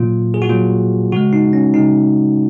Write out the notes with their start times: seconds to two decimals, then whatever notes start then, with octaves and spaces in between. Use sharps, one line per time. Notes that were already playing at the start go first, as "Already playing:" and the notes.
Already playing: A#2 F#3 A#3 F4
0.34 G#4
0.42 F#4
0.48 A#2 F#3 A#3 F4
1.12 C#3 G#3 F#4
1.33 D#4
1.53 C#4
1.74 C#3 G#3 D#4